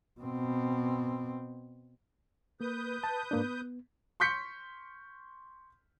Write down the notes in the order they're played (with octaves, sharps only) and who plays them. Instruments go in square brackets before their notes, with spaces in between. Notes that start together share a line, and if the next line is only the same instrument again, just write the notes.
[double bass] B2 C4
[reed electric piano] A#3 [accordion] B4 D#6 G6
[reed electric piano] A5
G#2 A#3 D4
B3
[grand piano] C6 C#6 G6 B6 C#7